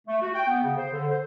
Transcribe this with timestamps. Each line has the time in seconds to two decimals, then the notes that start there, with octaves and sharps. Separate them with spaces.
0.07 A3
0.21 F#4
0.35 G5
0.48 B3
0.63 C#3
0.77 C5
0.92 D3
1.09 C5